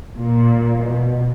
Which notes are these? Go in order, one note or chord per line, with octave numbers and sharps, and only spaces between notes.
A#2
B2